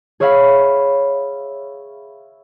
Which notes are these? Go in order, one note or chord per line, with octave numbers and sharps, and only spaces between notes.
G#4 C#5 E5 F5 B5